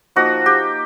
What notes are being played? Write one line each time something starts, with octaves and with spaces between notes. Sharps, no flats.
F3 A#3 D#4 F#4
G4